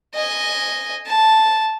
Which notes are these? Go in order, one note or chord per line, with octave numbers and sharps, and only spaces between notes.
D#5 G#5
A5